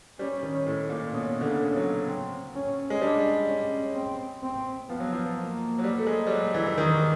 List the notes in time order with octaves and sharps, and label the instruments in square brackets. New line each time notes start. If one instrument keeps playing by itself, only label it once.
[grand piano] G3 [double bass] C#4
[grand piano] D#3
A2
A#2
[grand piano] B2 [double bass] C#4
[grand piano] D3
C#3
[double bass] C#4
[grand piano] F#3
[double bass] C4
C#4
[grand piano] G#3
[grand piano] G3 [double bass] D4
[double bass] C#4
C4
C4
[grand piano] F3 [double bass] B3
[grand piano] F#3
F3
[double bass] A#3
[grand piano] F#3
G3
A3
G#3
G3
F#3
E3
E3
D#3